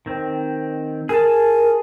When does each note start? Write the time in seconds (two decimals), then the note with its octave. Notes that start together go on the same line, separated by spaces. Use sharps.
0.06 D#3 C4
1.09 G#4 A#4 A5